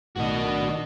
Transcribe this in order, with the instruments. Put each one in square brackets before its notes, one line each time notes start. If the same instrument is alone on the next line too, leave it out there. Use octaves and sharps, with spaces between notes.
[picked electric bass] B1 A2 [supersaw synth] D#3 D4 [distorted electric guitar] F#4 D#5